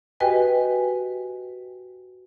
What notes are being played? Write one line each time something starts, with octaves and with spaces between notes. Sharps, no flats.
F#4 G4 B4 D#5 G5 G#5